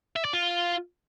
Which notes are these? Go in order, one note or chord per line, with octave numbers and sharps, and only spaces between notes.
E5
D5
F4